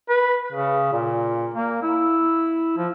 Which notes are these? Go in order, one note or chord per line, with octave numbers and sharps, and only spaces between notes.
B4
C#3
A#2
A#3
E4
F3